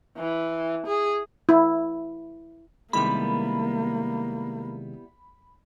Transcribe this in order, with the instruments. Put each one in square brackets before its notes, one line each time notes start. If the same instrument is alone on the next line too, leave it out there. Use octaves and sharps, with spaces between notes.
[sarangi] E3
G#4
[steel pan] E4
[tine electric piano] C3 D#3 G#3 [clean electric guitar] G3 B3 E4 [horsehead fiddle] A#3 [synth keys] B5